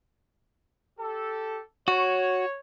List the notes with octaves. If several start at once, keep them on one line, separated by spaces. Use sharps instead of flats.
G4 A4
F#4 C#5